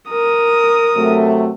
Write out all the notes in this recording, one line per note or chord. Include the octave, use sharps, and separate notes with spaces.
A#4 D#6
C3 F#3 A3